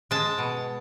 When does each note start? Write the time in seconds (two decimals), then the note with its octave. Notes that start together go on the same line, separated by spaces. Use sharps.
0.11 G#3 A5
0.38 B2